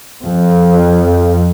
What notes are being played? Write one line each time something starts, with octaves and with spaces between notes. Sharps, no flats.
F2